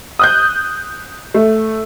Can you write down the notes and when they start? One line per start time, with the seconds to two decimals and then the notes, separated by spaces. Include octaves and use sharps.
0.19 D#6 F#6 G6
1.34 A3